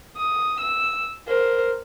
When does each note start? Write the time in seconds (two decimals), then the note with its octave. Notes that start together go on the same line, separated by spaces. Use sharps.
0.17 D#6
0.60 E6
1.27 A#4 C5